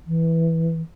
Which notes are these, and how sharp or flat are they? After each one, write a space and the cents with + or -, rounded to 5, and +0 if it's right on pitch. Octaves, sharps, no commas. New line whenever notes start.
E3 -5